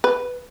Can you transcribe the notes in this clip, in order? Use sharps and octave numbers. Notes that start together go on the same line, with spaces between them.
B4